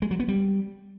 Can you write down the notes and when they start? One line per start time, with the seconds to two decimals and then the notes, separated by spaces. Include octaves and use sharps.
0.02 G#3
0.11 F#3
0.20 B3
0.28 G3